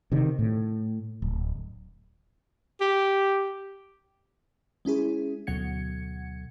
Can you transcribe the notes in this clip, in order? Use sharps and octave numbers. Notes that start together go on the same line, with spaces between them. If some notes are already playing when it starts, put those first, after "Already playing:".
C3 D#3
A2
D1
G4
G#3 C#4 E4 G#4
D2 B2 F#3 F#5 G#6 C#7